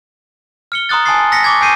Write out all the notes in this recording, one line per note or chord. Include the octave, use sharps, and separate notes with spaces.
F6 C#7 G7
A#5 C6 D#6 F#6 A6
G#5 A5 C6 D#6 A6 C7
E6 A#6 B6 C#7
C#6 D6 G#6
G#5 E6 G6 C7 D#7